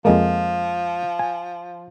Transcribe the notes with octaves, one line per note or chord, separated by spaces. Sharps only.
F2 F3 G#3 A#3
G#5